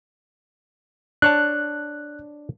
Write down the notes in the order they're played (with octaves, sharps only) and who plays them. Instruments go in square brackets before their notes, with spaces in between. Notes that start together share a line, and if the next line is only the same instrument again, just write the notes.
[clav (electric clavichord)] D4 C#5 A5 [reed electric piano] F#6